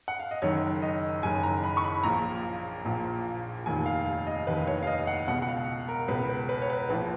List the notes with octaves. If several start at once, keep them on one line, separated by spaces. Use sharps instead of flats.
F#5
F5
D#5
F#1 F#2 D#3 C#5
D#5
F#1 F#2 D#3 G#5
A#5
B5
C#6
B5
A#1 A#2 F3 A#5
A#1 A#2 F3
F1 D#2 D#3 G#5
F5
F5
D#5
F1 D#2 D#3 B4
C#5
F5
D#5
F#5
C#2 B2 F#5
F#5
F5
A#4
C#2 B2 B4
B4
B4
C#5
B4
A#1 A#2 F3 B4